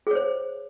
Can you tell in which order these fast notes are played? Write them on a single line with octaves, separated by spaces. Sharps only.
G#4 C#5 C5